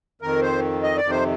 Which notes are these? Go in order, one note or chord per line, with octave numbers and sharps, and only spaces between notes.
F2 D#3 A#4
C5
D#5
D5
F2 C3 D#3
C5